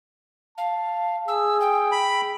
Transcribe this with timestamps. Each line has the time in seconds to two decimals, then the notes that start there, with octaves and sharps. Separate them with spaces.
0.58 F5 A5
1.28 G#4 E6
1.61 G5
1.92 B5